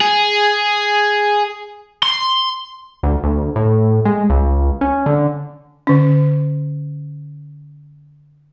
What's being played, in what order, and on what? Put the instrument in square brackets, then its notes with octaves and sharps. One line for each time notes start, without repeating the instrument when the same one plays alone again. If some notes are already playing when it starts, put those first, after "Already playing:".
[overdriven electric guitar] G#4
C6
[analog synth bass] D2
D2
A2
G#3
C#2
C#4
D3
[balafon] D3 C#4